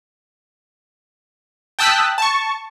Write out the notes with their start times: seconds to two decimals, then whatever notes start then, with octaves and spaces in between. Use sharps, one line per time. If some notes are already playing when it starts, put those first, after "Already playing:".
1.79 G5 A5 D#6 E6 F#6 B6
2.18 A5 C#6